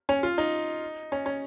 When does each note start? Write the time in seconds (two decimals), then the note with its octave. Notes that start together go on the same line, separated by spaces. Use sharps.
0.09 C#4
0.23 F4
0.38 D#4
1.12 C#4
1.26 C#4